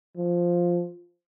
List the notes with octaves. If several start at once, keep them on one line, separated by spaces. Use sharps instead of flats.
F3